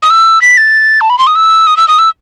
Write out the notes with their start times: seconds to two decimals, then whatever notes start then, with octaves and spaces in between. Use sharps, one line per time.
0.03 D#6
0.10 E6
0.42 B6
0.57 A6
1.01 A5
1.10 B5
1.19 C6
1.27 D#6
1.35 E6
1.67 D#6
1.77 E6
1.88 D#6
1.99 E6